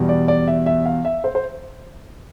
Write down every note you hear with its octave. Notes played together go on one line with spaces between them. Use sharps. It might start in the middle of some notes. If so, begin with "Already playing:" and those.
Already playing: E2 B2 G3
D5
D5
E5
E5
F5
E5
C5
C5